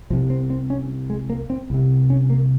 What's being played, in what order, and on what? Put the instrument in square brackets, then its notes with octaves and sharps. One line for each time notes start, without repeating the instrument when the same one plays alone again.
[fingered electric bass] C2 C3 F3
C4
C4
C#4
G#3
A#3
C4
C2 C3
C#4
A#3